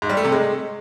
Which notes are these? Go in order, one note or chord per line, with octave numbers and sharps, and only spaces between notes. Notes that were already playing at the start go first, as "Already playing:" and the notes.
G#2
G3
A3
C3
G#3